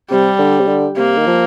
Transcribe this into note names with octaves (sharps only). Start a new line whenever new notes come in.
C3 G3
D3
C3
D3
C3 A#3
D#3
F3